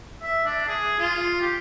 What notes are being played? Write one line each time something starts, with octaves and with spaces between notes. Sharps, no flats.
E5
D4
G#4
F4
G4